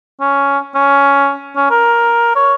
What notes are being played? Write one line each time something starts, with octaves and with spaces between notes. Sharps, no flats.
C#4
C#4
C#4
A#4
C#5